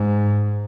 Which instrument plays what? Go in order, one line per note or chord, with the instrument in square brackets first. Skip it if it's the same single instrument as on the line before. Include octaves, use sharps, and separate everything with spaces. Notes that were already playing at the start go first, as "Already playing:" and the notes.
Already playing: [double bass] G#2